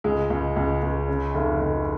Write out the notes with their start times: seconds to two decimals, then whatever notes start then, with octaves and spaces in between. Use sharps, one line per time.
0.04 C#2 G#3
0.30 C#2
0.56 C#2
0.82 C#2
1.08 C#3
1.34 F1
1.60 F1